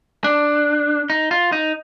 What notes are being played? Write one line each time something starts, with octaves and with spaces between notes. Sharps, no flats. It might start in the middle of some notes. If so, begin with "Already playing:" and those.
D4
D#4
F4
D#4